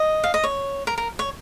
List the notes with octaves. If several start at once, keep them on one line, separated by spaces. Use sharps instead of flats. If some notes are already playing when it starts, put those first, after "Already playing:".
Already playing: D#5
F5
D#5
C#5
A#4
A#4
C#5